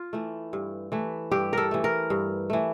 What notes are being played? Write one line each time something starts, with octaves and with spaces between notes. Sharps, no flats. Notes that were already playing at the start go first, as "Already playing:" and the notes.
Already playing: F4
E3 A3
G2
E3 A3
G2 G4
A4 A#4
E3 A3
A#4
G2
E3 A3